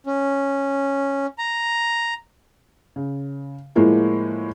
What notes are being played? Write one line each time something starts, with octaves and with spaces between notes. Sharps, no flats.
C#4
A#5
C#3
A2 F3 G#3 A#3 E4 F4